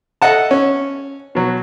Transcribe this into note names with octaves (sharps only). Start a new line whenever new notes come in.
A4 D#5 E5 F#5 A5
C#4
B2 F#3